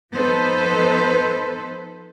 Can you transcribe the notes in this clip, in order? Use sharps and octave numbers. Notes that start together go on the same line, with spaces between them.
F3 B3 D#4 A4 B4 C5